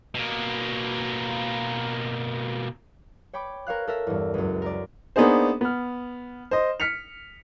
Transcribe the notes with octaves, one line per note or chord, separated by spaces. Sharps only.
B2 A#3
C#5 G5 B5 D6
A#4 C#5 F5 F#6
A4 A#4 E5
E2 G2
C#2 F#2
A#4 D5
A#3 B3 D4 D#4 G#4 C5
B3 F6
C5 D#5
F6 B6 C#7 F7